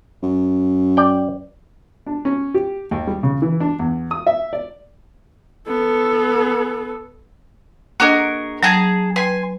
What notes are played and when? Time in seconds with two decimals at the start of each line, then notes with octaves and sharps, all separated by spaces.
0.23 F#2
0.97 D5 G5
2.06 D4
2.25 C#4
2.54 G4
2.91 D#2
3.07 G3
3.23 C#3
3.42 E3
3.60 D4
3.79 E2
4.11 D#6
4.27 E5
4.53 D5
5.68 B3 A4
8.00 A#3 D4 F#4 G#4 A#4 D#5
8.63 F#3 G#4 A5 A#5
9.16 B4 G#5 C6